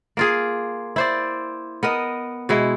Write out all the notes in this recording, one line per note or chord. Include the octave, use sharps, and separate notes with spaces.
A#3 F4 G#4
E4 C5 D5
B3 A#4 D#5
B2 G#3 E4